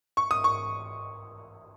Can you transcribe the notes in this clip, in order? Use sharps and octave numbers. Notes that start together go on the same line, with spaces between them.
C#6
D#6
C#6